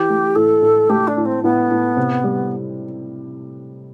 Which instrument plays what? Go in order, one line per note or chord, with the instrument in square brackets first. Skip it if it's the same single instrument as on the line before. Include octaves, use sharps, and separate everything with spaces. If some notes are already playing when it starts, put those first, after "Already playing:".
Already playing: [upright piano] E3 [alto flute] G4
[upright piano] A3
[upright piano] A2 [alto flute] A4
[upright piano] A2
[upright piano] A3 [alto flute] G4
[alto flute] D4
[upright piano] A2
[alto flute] C4
[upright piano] A2 [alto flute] B3
[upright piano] A2
C3
G3